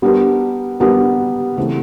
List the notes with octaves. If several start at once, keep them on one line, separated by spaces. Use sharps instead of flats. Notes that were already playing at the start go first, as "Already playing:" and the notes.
G3 B3 D4 G4 A#4
G3 B3 D4 G4 A#4
C#3 E3 A3 C4